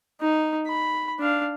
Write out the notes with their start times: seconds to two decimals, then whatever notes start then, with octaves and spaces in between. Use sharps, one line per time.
0.21 D#4
0.67 B5
1.20 D4 F5